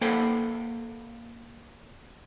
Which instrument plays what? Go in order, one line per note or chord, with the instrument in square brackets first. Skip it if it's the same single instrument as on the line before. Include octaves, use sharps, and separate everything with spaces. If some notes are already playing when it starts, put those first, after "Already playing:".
[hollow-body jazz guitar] A#3 A4 C5 F#5 G5